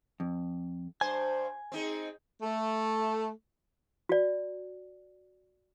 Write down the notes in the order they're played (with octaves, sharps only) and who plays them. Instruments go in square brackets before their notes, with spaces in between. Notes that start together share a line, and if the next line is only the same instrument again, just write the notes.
[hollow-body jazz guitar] F2
[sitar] G2 C5 [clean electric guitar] G#5
[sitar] C4 D#4 G#4
[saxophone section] A3
[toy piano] F#4 D5